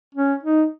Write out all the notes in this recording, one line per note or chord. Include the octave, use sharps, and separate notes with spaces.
C#4
D#4